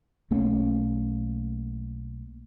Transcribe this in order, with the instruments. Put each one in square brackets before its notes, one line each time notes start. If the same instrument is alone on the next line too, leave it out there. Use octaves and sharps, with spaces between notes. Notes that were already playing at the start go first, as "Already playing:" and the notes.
[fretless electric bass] B1 A3 A#3 C#4